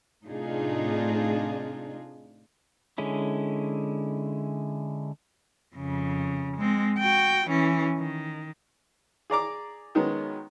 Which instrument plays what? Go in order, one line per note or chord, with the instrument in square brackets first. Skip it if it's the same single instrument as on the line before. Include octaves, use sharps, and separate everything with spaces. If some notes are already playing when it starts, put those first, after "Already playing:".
[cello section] A2 C3 D4 D#4 F4 G#4
[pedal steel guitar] D3 G#3 C#4 E4
[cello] F2 C#3
G#3 C4
F#4 G5
E3 C#4
D#3
[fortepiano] G#4 D5 A#5 D6
D#3 F#3 G#3 B3 C#4